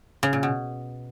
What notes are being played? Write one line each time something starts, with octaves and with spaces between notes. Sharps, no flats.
C#3
A#2
B2